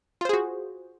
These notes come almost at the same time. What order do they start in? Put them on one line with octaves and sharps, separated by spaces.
F4 C5 G#4 F#4